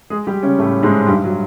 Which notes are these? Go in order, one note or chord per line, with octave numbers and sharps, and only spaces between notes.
G#3 G#4
G3 G4
C#3 C#4
A2 A3
G#2 G#3
G2 G3
F#3